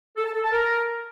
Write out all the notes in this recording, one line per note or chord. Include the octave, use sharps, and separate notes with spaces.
A4
A5
A4
A5
A#4